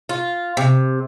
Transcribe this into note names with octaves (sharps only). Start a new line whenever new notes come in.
F4
C3